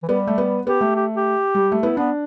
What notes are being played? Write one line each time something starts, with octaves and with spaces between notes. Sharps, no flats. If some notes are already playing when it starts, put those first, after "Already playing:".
E3
G3 B3
A3
B3
B3 G4
A3
G4
G4
G3
A3
B3 E4
B3 D4